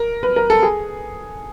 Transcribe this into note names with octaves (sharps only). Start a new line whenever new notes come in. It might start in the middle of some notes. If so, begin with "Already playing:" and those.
Already playing: A#4
B4
A#4
A4
G#4